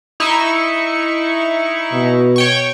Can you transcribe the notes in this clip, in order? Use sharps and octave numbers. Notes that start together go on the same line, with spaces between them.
D#4 E4 C#6
B2
C#5 G5 C#6